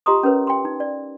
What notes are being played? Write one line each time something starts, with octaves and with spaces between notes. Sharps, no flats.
F4 G4 D#5 A#5 C6 D#6
C#4 A#4 B4 C#5
G5 C6
D#4
D5